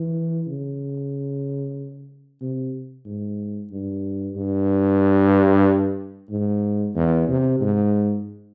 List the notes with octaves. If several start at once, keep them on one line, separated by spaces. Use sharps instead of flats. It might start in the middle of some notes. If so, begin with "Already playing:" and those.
Already playing: E3
C#3
C3
G#2
G2
G2
G#2
E2
C3
G#2